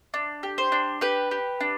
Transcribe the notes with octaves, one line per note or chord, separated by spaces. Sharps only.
D4
G4
C5
D4
G4 B4
G4
D4